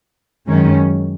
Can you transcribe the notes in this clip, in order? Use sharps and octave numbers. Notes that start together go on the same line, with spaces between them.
F#2 D#3 G#3 C#4